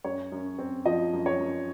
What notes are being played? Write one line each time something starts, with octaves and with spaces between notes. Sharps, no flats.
F#2 C#5
F#2
C4
F3 D#5
F#2
C#5
F#2